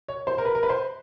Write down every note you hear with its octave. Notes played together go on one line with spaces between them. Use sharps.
C#5
C5
A#4
B4
A#4
B4
C5